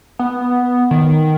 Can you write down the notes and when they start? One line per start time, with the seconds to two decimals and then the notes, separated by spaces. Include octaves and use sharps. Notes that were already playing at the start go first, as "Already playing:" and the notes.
0.19 B3
0.91 D#3